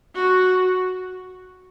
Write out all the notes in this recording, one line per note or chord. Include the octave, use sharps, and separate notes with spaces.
F#4